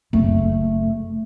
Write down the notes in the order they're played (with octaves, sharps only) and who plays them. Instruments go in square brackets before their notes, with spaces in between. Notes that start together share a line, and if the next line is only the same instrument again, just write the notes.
[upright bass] F#1 C4 [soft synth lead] A3